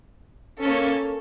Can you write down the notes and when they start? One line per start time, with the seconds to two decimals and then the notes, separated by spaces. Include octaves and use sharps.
0.61 A#3 C#4 A4